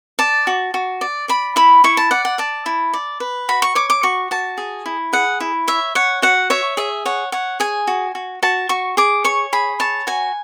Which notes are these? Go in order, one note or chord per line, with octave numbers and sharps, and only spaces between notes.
D5 A5
F#4
F#4
D5
D5 B5
E4 B5
E4 C#6
A5
D5 F#5
F#5
D5 A5
E4
D5
B4
F#4 B5
C#6
C#5 D6
D6
F#4 C#6
F#4 A5
G#4
E4
G#4 F#5
E4
C#5 E5
C#5 F#5
F#4 F#5
C#5 E5
G#4 E5
C#5 F#5
C#5 F#5
G#4 G#5
F#4
F#4
F#4 A5
F#4 C#6
G#4 D6
C#5 C#6
G#4 B5
C#5 A5
F#4 G#5